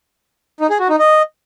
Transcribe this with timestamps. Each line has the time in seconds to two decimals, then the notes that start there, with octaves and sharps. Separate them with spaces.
0.60 D#4
0.70 G#4
0.80 F#4
0.89 D#4
0.99 D#5